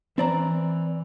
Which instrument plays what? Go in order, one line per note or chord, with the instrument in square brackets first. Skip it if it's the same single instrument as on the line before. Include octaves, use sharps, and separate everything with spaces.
[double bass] E3 [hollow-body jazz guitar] C4 D5 A#5